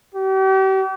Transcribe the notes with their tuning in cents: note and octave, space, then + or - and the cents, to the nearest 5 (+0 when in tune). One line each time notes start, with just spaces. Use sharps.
G4 -40